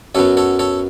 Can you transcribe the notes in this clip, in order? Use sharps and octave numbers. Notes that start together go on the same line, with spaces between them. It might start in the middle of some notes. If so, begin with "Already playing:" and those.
F#2 F#3 B3 A4 C#5
A4 C#5
A4 C#5